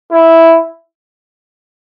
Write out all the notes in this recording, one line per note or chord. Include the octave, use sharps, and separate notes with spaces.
E4